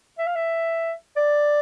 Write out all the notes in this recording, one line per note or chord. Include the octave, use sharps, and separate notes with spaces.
E5
F5
E5
D5